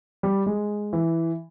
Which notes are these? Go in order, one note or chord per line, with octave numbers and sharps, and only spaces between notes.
G3
G#3
E3